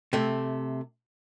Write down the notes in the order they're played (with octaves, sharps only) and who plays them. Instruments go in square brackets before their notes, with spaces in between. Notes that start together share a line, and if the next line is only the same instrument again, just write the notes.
[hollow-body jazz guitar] C3 A3